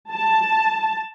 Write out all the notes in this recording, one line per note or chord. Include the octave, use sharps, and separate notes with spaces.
A5